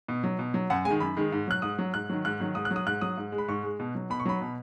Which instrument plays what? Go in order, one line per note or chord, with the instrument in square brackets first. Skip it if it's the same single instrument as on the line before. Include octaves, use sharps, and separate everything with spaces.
[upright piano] B2
F#3
B2
F#3
F#2 F#5
G#3 G#5
D#3
F#2 B5
D#3 G#3
G#2
F#3 F#6
G#2 D#6
F#3
G#2 F#6
D#3 F#3
G#2 F#6
D#3 F#3
G#2 D#6
F#6
F#3
D#6
G#2 F#6
F#3 D#6
G#2
G#3
B5
G#2 C#6
G#3
B2
F#3
B2 B5
C#6
F#3 B5
B2